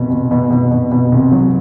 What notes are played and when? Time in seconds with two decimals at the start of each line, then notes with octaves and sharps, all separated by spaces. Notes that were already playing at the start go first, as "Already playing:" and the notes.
Already playing: C2 B2
0.10 B2
0.31 B2
0.50 B2
0.71 B2
0.92 B2
1.12 C2
1.31 F#3